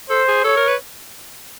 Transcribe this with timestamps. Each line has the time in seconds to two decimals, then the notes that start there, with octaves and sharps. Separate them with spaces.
0.10 A4 C5
0.28 G#4
0.44 A4 C#5
0.57 A#4
0.68 B4